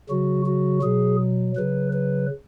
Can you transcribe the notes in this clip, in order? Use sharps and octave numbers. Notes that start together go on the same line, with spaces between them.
C#3 F#3 F#4
F#4
B2 F#3 G#4
C#3 F#3 B4
B4